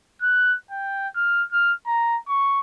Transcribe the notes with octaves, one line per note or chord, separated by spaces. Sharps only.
F#6
G5
F6
F6
A#5
C#6